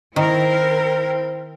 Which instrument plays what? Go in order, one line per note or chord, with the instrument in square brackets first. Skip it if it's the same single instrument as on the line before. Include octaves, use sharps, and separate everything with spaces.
[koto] D#3 [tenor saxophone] C4 [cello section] E4 A#4